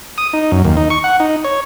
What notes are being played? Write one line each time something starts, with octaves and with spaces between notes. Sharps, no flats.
D#6
D#4
F#2
D#2
D#4
C#6
F#5
D#4
C#5